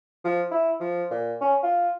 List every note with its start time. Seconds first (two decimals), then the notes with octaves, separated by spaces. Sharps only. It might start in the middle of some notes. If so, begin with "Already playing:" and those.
0.24 F3
0.51 E4
0.80 F3
1.11 A#2
1.41 C#4
1.63 F4